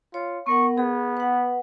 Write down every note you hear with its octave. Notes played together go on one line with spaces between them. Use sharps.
F4 C#5
B3 A#4 F#5 C#6
B3 G#4
B4 F#5